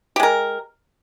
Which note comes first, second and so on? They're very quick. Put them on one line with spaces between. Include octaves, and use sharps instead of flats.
G4 G#3 A#4